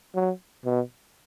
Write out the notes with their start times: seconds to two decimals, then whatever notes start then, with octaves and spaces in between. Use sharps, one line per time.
0.15 F#3
0.65 B2